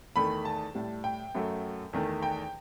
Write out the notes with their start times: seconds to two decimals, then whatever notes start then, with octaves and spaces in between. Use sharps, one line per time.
0.16 E2 D#3 A3 B5
0.45 A5
0.75 A2 G3
1.04 G5
1.35 F#2 F#3 A3
1.93 E2 D#3 A3
2.23 G5